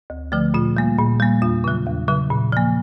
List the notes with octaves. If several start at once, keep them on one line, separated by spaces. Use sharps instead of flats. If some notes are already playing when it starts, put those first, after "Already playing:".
D2
D3 F3 A3
A#2 F4
G3 A#3
A#2
G3 A#3
E2 F4
C#3 F#3
E2
C#3 F#3
A#2
F3 A#3